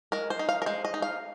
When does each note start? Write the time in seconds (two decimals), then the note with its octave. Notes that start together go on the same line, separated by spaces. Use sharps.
0.12 G#3 A#4
0.30 C5
0.39 D#4
0.49 F5
0.62 A#4
0.66 G#3 C5
0.85 D#5
0.94 D#4
1.02 F5